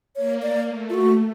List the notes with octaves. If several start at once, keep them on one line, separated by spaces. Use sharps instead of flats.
A#3 C#5
D5
A3
F4
F#4